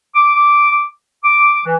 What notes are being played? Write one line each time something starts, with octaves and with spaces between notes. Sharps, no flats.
D6
D6
E3